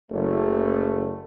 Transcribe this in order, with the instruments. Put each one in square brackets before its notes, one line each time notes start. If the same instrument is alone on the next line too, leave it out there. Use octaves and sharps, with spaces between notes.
[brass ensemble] F#1 A3